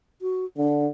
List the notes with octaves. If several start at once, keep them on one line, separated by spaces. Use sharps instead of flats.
F#4
D3 D4